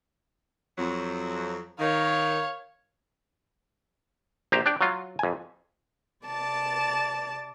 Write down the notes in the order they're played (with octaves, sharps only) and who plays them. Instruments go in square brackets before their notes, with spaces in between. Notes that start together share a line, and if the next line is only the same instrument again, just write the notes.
[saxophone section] F2 F#3
[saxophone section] D#3 [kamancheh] C#5 F5
[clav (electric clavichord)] A#1 G4 C5 A#5
D4 D5 G5
F#3 F4
F2 G#5
[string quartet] C3 D5 A5 A6